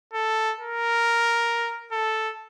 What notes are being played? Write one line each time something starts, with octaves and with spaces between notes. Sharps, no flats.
A4
A#4
A4